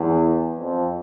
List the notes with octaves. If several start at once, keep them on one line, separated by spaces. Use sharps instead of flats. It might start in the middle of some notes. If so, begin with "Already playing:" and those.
Already playing: E2
F2